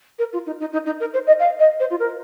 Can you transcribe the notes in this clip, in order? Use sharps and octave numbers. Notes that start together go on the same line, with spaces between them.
A#4
F4
D#4
D#4
D#4
D#4
A#4
C5
D#5
F5
D#5
C5
F4
A#4